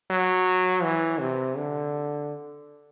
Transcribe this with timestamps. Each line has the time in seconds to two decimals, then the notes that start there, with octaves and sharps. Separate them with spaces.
0.11 F#3
0.83 E3
1.20 C3
1.57 D3